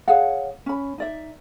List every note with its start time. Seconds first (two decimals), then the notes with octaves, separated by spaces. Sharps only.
0.08 G#4 C#5 F5 F#5
0.66 C#4 B5
0.98 D#4 D5 E5